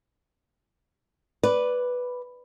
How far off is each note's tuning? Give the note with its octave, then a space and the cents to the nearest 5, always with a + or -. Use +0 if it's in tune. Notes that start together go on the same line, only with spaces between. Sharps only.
B4 +0 D5 -5